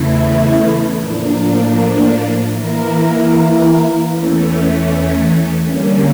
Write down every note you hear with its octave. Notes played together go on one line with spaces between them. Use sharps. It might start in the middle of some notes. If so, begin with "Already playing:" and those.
Already playing: E2 C#3 E3 A3 E4
A2 F3 A#3 D4
E3 A#3 E4 A#4
E2 E3 A3 C#4
D3 G3 A#3 C#4